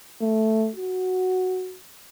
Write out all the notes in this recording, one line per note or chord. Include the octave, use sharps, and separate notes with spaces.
A3
F#4